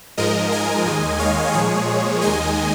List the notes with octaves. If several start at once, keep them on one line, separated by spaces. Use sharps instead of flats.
G#2 F3 G#3 A#4 D#5
D#5 G#5
D#2 D#3 G#3
C#5 F5
A#2 F3 G#3 G#4 C#5
G#4
D#2 D#3 G#3 D#5 G#5